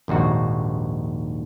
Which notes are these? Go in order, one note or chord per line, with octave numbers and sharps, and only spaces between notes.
A#1 D#2 G#2 F#4